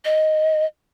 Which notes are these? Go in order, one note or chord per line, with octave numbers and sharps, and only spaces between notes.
D#5